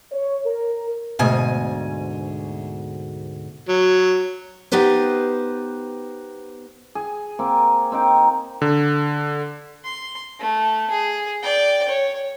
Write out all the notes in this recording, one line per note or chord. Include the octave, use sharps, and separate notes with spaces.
C#5
A#4
D2 G#2 B2 G#5
F#3
B3 D#4 G4 B4 C5
G#4
A#3 C4
C4 D#4 G5
D3
C6
A3
G#4
D5 G5
C#5